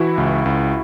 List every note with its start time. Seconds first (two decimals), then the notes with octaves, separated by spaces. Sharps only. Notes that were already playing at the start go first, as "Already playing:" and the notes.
Already playing: E3 E4 F#4
0.18 C#2
0.46 C#2